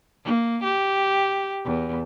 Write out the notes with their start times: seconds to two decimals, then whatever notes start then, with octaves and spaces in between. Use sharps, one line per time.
0.24 A#3
0.63 G4
1.65 E2